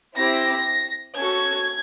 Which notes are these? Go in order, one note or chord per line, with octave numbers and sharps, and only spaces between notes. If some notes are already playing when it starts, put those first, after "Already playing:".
C4 E4 G4 A#6
C#4 F#4 A4 G#6